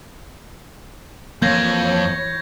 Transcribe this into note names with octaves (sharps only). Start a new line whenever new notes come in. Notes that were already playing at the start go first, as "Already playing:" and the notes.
F2 E3 A#3 C#5 G6 G#6 A#6